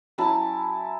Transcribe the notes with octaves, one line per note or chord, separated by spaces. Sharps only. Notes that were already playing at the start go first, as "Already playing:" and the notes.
F#3 C#4 E4 A5